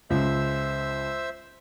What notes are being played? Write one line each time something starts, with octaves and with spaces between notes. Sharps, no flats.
C#2 C5 E5 E6